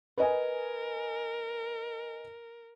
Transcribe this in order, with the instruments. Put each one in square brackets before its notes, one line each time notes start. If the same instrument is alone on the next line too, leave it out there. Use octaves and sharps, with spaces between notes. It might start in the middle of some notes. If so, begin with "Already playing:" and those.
[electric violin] A#4 [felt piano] B4 D#5 G#5